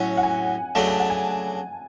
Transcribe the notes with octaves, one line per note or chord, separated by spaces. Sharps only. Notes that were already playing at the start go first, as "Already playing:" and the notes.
Already playing: A2 F#3 C#4 F#5
F#5
G#5
C#3 F#3 A3 D4 A5
G#5
F#5
G#5